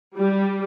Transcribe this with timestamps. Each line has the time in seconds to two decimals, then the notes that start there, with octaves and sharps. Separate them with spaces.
0.16 G3